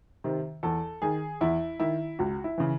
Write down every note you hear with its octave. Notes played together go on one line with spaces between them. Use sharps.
C3 D#3
E2 A4
D#3 G#4
E2 E4
D#3 E4
C#2 F#4
E4
C#3 E3